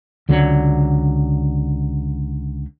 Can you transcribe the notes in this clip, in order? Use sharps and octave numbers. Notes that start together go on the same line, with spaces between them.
C#2 D3 F#3